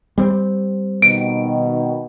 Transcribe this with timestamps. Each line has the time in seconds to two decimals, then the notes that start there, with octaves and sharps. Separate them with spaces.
0.18 G3 C4
1.02 B2 D#3 D7